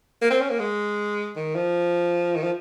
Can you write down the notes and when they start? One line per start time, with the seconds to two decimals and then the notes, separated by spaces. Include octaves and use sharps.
0.22 A#3
0.30 C4
0.40 C#4
0.50 A#3
0.59 G#3
1.36 D#3
1.55 F3
2.36 D#3
2.43 F3